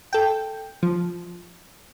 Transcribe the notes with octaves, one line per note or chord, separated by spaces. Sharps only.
A4 G5
F3